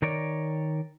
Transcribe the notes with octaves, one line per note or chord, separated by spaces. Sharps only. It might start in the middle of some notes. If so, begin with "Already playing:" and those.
D#3 A#4 C#5 D5